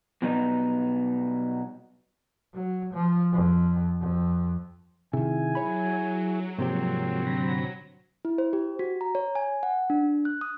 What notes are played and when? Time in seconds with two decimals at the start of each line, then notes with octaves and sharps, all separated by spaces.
0.22 B2 F#3 G3 B3 D#4
2.54 F#3
2.94 F3
3.32 F2
4.01 F2
5.13 C3 D#3 E4 G#4 G#5
5.55 F#3 C#5 B5
6.59 G#2 C3 F3 F#3 G#3 A#3 C4 G4
7.27 D3 B5 A#6
8.25 E4
8.38 C5
8.53 G4
8.79 F#4
9.01 A#5
9.15 C#5
9.35 G#5
9.63 F#5
9.90 D4
10.25 F#6
10.41 D#6